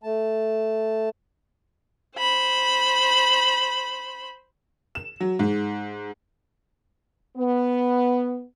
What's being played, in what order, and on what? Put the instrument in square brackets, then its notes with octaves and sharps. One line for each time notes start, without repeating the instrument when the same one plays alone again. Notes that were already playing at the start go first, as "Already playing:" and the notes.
[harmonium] A3 A5
[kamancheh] C5 B5
[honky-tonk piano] E7
F#3
G#2
[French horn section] B3